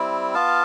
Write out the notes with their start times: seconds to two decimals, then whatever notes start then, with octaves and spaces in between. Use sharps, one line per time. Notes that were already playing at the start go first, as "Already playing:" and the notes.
Already playing: G3 C4 E4
0.34 B3 F4 F5 A5